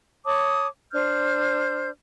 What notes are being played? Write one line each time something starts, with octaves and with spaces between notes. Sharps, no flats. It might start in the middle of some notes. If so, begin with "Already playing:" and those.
C#5 A5 D6 D#6
D4 C5 F6 G6